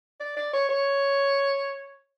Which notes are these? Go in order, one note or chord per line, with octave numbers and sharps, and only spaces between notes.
D5
D5
C#5
C#5